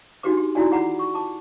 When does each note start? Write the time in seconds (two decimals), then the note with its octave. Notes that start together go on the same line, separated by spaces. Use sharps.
0.23 D4 D#4 F#4 G4 B4 D6
0.37 G4
0.55 D#4 E4 F#4 D5 G#5
0.71 F4 G#4 F#5 A#5 B5
0.99 C#6
1.14 A5 D6